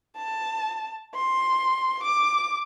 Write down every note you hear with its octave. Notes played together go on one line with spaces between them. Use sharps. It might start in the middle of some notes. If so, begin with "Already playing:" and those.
A5
C6
D6